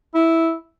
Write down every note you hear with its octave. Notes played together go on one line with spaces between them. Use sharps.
E4